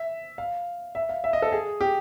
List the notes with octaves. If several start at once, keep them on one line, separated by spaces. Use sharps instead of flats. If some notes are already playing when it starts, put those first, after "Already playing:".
Already playing: E5
F5
E5
F5
E5
D#5
A4
G#4
G4